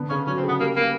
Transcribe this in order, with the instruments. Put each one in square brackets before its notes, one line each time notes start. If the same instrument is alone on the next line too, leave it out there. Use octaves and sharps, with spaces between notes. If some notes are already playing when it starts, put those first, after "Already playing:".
Already playing: [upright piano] D3 B3
[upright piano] C#3 [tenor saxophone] C#4
[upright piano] F#3 [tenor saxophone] C#4
[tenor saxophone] C4
[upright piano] C#3 [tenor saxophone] B3
[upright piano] G3 [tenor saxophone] A#3
[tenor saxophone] A#3 [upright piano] B3